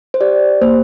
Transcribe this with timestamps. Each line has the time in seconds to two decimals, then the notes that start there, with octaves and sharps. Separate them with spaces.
0.14 C5
0.21 G4 D5
0.61 A#3 C5